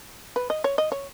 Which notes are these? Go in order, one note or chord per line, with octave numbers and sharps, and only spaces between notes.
B4
D#5
C#5
D#5
C#5